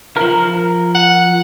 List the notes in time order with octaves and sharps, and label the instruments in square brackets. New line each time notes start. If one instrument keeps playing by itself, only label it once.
[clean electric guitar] F3 A#4
[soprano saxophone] F#5